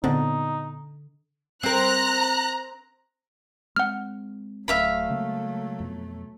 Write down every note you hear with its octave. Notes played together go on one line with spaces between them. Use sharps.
A#2 D3 B3 C4 D#4
C4 A#4 A#5 F#6
G#3 C4 F#5 F6
D1 F#3 A3 E5 F5 B5
C#3 G#3 A#3
F2 B2